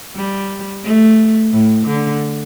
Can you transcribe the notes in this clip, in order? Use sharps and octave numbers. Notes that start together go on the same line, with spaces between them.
G3
A3
A2
D3